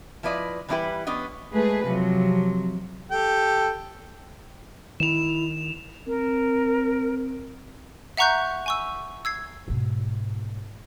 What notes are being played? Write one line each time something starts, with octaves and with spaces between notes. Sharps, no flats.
F3 E4 B4 D5 D#5
E3 G3 D4 E4 G4 B4
B3 C#4 D4 D#5
G#3 A3 G#4 B4
C3 F3 F#3
G4 A4 G5
D#3 E4 E7 F7
C4 A#4
E5 F#5 A#5 C#6 F#6 G6
G#5 C#6 E6
E6 G#6 C7
G#2 B2